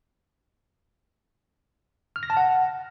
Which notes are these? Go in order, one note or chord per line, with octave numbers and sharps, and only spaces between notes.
F6
A#6
A5
F#5